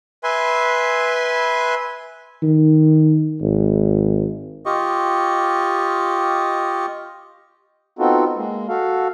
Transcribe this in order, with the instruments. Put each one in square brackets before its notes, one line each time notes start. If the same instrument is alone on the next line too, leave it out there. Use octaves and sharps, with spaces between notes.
[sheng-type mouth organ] B4 E5 G#5 C6
[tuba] D#3
G#1
[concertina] F4 G4 D#5 C#6
[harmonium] B3 C4 D#4 F4 F#4 A4
G#3 A#3
F#4 A4 F5